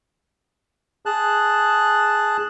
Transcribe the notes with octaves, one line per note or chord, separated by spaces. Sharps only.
G#4 A5 F#6